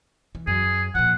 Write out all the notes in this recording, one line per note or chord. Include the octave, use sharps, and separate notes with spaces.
E3
F#2 G#4
A#2 F3 F#5